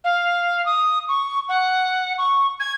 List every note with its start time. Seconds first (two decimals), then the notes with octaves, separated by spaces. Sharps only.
0.04 F5
0.66 D#6
1.09 C#6
1.49 F#5
2.18 C#6
2.60 G#6